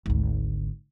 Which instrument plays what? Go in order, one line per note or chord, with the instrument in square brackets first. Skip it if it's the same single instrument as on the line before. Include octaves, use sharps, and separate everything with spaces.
[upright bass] G#1 D2